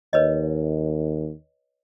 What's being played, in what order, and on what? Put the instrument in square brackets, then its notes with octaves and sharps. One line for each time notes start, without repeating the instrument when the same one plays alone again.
[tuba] D#2 [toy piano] B4 C#5 D#5